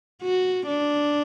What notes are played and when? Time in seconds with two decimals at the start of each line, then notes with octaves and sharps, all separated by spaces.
0.22 F#4
0.67 D4